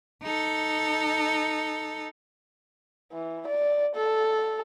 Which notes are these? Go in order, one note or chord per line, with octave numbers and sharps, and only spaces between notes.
D#4 A4
E3
D5
A4